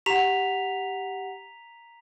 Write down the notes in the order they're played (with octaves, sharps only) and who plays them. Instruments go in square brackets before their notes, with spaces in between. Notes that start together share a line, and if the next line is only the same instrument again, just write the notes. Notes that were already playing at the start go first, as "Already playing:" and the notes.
[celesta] G4 F#5 [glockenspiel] A#5 B6 F7